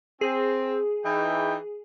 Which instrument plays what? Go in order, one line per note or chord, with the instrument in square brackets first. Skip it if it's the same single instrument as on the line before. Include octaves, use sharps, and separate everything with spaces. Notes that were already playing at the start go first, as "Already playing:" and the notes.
[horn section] C4 [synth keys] G#4
[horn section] E3 D#4 G5